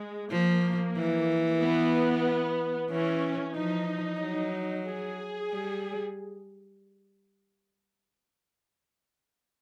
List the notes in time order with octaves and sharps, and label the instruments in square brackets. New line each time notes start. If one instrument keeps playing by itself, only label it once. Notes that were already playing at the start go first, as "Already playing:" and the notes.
Already playing: [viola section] G#3
[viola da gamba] F3 [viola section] A#3
[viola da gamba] E3
[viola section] B3
[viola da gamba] E3 [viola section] C#4
[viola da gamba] F3 [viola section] D#4
[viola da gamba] F#3
[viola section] G#4
[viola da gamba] G3